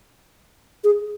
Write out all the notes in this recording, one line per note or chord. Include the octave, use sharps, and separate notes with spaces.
G#4